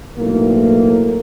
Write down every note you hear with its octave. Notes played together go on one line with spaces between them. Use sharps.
B1 A2 A#3